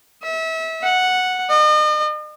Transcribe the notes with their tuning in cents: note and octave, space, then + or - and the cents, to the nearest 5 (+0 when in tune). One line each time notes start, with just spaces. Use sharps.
E5 -30
F#5 -5
D#5 -40